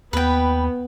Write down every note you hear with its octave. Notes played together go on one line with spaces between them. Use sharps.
D#2 B3 B4 G5